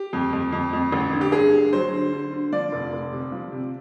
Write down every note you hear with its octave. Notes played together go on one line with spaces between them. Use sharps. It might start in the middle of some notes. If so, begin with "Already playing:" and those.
Already playing: G4
F2
F2
F2
F2
A1
D3
G4
G2 G#4
D3
F#3 C5
D3
D3
D3
F3 D5
F1
F1
C3
F3
C3